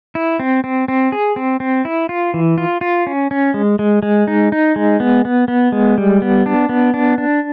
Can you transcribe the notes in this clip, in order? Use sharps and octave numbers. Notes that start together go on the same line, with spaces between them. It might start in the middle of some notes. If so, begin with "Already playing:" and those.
E4
C4
C4
C4
G#4
C4
C4
E4
F4
E3
F4
F4
C#4
C#4
G#3
G#3
G#3
D#4
D#4
G#3
B3
B3
B3
G#3
G3
B3
D4
B3
D4
D4